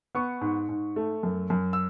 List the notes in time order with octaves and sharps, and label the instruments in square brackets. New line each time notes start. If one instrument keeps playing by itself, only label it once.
[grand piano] B3 C#6
G#2
G#2
A3
F#2
F#2
E6